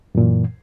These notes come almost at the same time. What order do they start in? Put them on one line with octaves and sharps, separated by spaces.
F#2 A#2 E3